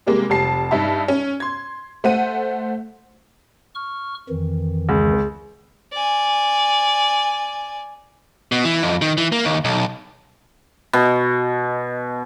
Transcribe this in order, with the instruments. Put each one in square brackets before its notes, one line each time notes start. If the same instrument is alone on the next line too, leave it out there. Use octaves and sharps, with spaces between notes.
[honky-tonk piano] C3 G3 G#3 A#3
F1 G3 A5 C7
G2 D#4 E5 A5
C#4
C6 G#6
A3 C5 F#5 D#7
[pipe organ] C#6 F6
F2 D#3 E3
[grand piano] C#2
[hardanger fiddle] D5 G#5
[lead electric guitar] B2
E3
F2
D#3
E3
A#3
D#2
B1
[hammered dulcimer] B2